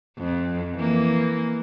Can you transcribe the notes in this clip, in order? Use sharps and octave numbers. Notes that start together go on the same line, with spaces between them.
F2
E3 A#3